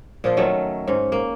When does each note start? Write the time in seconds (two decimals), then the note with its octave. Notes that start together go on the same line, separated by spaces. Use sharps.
0.24 A#2 F3 F4
0.37 D#3 F#3 A3 C#4
0.88 G#2 C#4
1.12 A#3